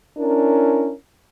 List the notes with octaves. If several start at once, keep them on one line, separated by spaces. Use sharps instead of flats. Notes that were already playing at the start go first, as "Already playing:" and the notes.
C#4 D4 E4 A#4